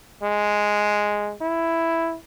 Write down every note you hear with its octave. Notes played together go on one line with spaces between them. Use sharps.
G#3
E4